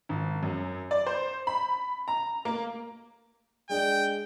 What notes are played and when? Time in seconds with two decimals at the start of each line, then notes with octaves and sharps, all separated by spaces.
0.09 G#1
0.43 F#2
0.91 D5
1.06 C5
1.47 B5
2.08 A#5
2.45 A#3
3.69 G#3 D4 G#4 G5